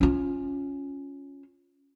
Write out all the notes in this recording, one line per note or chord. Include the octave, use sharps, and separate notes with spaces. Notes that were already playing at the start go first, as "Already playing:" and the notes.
C#4 F4